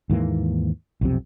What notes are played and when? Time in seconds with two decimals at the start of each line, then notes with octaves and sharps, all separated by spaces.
0.10 D#2 G#2 E3 A#3
1.01 B1 F2 C3